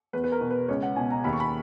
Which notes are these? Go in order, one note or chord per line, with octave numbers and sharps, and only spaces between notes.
E2 B4
B4
A#4
B2
B4
C#2 C#5
F#5
B2 G#5
A#5
D#2 B5
C#6
B5